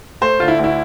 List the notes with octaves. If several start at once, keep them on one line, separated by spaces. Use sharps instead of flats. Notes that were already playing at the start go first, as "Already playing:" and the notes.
A3 C5
D3 F4
E4
D2
E4